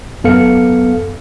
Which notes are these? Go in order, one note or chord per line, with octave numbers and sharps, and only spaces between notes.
F#2 B3 A4 F5 C#7